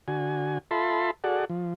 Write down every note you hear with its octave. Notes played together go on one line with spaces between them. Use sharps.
D3 F#4 G#5
F4 A4 E5 A5 B5 C6
F#4 G#4 A4 D5 F#5
F3